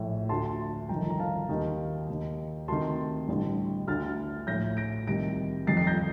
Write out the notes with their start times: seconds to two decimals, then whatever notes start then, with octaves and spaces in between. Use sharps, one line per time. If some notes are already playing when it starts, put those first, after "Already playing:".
Already playing: A#1 A2
0.29 D2 D3 A5 C6
0.89 G1 F2 D#3 G5 A#5
1.10 A#5
1.20 F5 A5
1.49 D#2 D#3
2.09 D#2 D#3
2.68 D2 C3 D#3 A5 C6
3.28 A1 G2 D3
3.87 D2 D3 F6 A6
4.47 A#1 A2 G6 A#6
4.77 A#6 D7
5.07 C2 C3 D#3 A#6 D7
5.66 G1 F2 D#3 A6 C7
5.77 C7
5.87 G6 A#6